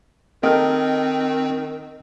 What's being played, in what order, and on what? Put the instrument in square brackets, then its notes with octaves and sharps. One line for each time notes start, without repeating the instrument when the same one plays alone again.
[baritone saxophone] D#3 [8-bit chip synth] C4 [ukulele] A4 A#4 G5 [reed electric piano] D#5